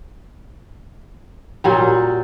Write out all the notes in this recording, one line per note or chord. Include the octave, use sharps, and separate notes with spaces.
A#2 F#3 G3